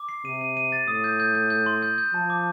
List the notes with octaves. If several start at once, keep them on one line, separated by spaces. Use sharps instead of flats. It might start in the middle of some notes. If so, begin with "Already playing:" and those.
Already playing: D6
C7
C3 D#7
D#7
D#7
A6
A2 D#6
G6
G6
G6
G6
C6
G6
G6
F3 A5
D6